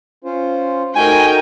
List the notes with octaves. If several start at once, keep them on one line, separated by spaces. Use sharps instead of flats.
C#4 F4 C5
A3 D#4 F#4 A#4 G5 G#5